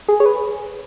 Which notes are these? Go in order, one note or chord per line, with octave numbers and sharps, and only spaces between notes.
G#4
C#5
B4